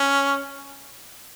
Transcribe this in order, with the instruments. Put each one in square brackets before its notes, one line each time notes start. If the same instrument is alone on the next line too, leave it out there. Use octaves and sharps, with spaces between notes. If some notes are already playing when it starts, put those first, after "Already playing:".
Already playing: [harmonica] C#4